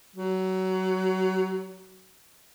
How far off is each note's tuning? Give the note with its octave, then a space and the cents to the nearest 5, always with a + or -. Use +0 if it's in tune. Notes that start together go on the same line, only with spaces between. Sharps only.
F#3 +20